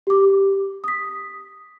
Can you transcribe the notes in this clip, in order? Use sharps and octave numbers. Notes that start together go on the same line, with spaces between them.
G4 D6
D#6 B6